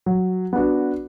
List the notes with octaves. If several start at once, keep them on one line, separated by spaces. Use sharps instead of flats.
F#3
B3 D4 F#4